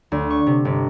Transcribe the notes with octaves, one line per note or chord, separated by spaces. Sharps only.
D2
C#6
C3
G1